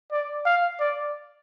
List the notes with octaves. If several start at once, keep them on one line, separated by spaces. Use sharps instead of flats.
D5
F5
D5